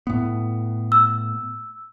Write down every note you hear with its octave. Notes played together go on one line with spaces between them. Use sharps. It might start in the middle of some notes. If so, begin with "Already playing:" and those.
A2 B3
E6